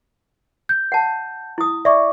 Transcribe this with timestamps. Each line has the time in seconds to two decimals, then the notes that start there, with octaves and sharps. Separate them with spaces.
0.69 G6
0.92 F#5 A5
1.58 E4 D#6
1.85 D5 E5 C#6 D6